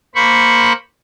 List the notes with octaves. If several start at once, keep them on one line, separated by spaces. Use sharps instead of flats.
A#3 C5 B5 C#6